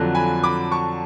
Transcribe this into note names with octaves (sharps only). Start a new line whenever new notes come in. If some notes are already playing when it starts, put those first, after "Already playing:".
Already playing: F2 D3 F#3
G#5 B5
B5 D6
A5 C#6